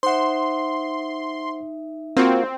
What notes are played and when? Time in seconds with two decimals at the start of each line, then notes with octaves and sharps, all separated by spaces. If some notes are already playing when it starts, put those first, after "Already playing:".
0.03 D#4 C5 E5 F#5 C6
2.17 A#3 C4 F4 F#4